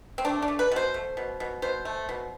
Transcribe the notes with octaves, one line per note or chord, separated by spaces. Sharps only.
C4
A3 D4
D4
A3
B4
B2 C5
A3
B2
B2
B2 C5
A3
B2